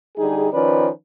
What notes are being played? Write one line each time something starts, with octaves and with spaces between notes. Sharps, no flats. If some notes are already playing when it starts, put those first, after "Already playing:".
D3 G3 D#4 G#4
D#3 F3 C#4 B4 D5